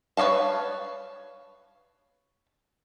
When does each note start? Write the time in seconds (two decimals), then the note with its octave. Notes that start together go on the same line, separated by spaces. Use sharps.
0.17 B4 C#5 D#5 F5 A5